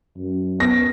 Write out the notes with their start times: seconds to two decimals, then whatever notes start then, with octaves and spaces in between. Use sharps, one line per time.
0.17 F#2
0.60 B3 A#6